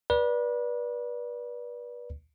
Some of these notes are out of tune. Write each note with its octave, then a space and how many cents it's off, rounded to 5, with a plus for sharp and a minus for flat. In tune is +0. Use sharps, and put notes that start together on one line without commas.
B4 -30 D5 +0